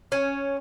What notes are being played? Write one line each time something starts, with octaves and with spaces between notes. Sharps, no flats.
C#4